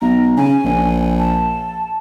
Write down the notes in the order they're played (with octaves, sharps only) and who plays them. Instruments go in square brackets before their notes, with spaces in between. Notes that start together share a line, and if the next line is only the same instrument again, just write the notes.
[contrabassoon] B1 [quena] A#5
[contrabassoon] C#3 [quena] G#5
[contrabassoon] A#1
[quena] A5